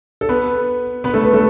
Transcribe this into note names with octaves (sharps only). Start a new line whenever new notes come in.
A4
B3 B4
B3 B4
A3 A4
B3 B4
A3 A4